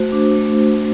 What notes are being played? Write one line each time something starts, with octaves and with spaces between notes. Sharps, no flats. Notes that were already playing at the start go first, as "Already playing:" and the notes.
Already playing: A3 F#4 C5
D4
A3